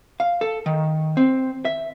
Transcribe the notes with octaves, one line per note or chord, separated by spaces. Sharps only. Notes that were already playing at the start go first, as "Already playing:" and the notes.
F5
A4
D#3
C4
E5